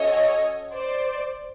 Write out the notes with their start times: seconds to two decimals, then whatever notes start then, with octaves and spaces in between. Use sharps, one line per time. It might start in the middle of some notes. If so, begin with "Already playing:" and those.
Already playing: C#4 F#4 A4 C#5 D#5
0.72 C5 D5